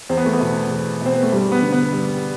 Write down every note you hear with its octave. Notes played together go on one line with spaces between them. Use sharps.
E2 C4
B3
A3
B3
B2
E2
B2 C4
B3
A3
G2 G3
B3
D3
B3
G2